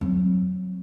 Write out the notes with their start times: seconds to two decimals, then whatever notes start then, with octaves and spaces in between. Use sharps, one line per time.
0.01 F#3 C4